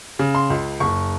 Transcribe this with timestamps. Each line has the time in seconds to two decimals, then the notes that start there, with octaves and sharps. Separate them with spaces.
0.19 C#3
0.35 C6
0.50 C#2
0.80 F#1 C#6